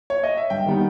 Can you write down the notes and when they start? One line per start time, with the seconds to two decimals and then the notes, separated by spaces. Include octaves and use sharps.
0.10 C#5
0.24 D#5
0.37 E5
0.50 G2 G5
0.66 D#3 G3 B3 D#4